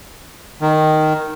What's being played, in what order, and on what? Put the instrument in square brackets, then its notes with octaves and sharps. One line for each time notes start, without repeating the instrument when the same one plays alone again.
[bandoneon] D#3